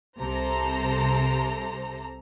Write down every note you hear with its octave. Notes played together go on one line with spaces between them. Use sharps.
C2 C3 A4 C5 A#5